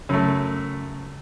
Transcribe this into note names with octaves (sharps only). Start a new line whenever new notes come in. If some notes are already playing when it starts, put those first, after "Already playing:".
F#2 C#3 A3